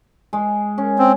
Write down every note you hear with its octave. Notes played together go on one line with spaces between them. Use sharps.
G#3
C#4
C4